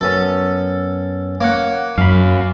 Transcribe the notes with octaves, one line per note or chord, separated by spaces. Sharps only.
F#2 B3 C#4 A4
A#3 C#5 F#5
F#2 F5 B5